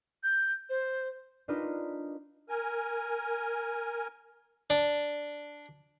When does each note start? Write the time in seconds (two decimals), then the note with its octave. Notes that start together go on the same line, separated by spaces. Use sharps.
0.24 G6
0.70 C5
1.48 D4 D#4 F4 A#4 B4 D#5
2.49 A#4 G#5
4.70 D4